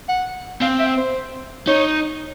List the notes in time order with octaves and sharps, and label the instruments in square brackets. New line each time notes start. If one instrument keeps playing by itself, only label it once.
[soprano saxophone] F#5
[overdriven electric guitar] C4 [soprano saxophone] F5
[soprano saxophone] E5
C5
[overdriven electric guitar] D#4 [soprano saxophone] C#5